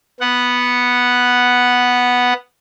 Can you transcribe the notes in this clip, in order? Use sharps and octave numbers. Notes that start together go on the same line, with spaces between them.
B3 F#5